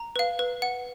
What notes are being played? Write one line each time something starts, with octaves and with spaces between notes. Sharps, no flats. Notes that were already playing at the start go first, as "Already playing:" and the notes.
Already playing: A#5
B4 F5
B4
F#5